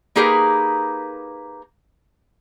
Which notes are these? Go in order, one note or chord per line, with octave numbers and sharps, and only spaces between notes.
A#3 D#4 G4 G#4 A#4 B4